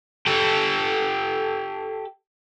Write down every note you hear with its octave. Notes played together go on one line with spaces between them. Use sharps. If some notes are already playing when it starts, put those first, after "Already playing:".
G4 A4